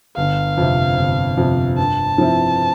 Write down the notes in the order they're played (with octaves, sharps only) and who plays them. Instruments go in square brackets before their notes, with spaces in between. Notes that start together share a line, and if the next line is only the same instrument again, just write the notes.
[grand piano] G1 [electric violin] F5
[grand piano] F2 C3
G1
F2 C3
[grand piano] G2 [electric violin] A5
[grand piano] F3 C4 E4